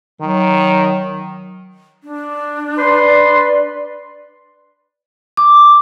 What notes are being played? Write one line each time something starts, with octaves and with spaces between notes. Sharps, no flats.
D#3 F#3
D4
B4 D5 C6
D6